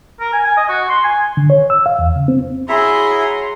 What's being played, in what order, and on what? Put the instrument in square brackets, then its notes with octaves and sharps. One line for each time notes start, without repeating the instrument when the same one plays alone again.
[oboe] A#4
G#5
G#5
D#5
F#4
C6
G#5
[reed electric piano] D3
C#5
E6
F5
E2
C#3
C4
[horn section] F#3 A#5 C6 [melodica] E4 E5 [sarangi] G#4